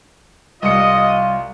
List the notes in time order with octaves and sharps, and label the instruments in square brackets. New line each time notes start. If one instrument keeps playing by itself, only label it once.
[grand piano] C2 C#7 [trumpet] F4 [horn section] D#5